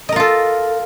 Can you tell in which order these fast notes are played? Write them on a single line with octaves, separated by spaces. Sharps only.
D#5 A#4 F4 A4